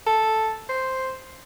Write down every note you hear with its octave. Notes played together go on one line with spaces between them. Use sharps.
A4
C5